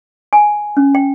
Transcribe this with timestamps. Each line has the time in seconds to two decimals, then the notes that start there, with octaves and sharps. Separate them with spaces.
0.33 G#5
0.77 C#4
0.95 G5